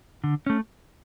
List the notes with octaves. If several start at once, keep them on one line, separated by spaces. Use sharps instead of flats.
D3
A3 C#4